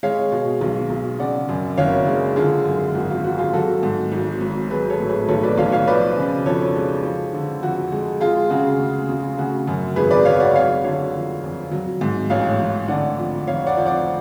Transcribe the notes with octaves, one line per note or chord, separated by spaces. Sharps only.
G#3 C#5 F5
B2
B1
B1
C#3 D5 F#5
F#2
F#1 C#5 F5
G#3
D3 F4 G#4
F#2
G#1 F#4
F4
F#3 F#4
F4 G#4
F#3 F#4 A4
G#2
G#1
G#1
F#3 G#4 B4
A4 C#5
A2
G#4 B4
B1 A4 C#5
B4 D5
B1 C#5 F5
C#5 F5
F3 B4 D5
C#3
F2 A4 C#5
G#3
F3
D3
F2 F#4
G#3
G#3 F4 G#4
C#3 F#4
D2
D2
C#3 F#4
F#2
G#1 G#4 B4
B4 D5
F#3 C#5 F5
D5 F#5
G#3 C#5 F5
D3 C#5 F5
F2
F2
F#3
G#2
A1 C#5 F5
A1
D3 D5 F#5
F2
F1 C#5 F5
D5 F#5
F3
D5 F#5